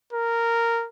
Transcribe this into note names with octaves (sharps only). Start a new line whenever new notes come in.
A#4